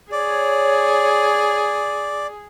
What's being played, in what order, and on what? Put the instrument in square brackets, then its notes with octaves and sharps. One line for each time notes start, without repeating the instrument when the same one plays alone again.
[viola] G#4 [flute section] C#5 [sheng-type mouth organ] D5